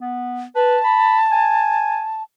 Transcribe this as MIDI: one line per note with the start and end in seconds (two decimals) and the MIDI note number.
0.01 0.43 59
0.55 0.77 71
0.55 2.23 81
0.84 1.17 83
1.32 2.03 80